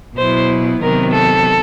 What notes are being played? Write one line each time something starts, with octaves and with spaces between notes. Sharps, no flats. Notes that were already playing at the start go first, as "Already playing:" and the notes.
B2 F#3 B3 E4 C5
C3 D#3 F#3 B3 A#4
A4